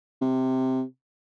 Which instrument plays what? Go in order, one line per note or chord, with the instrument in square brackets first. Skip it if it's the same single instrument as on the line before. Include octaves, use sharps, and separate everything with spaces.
[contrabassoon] C3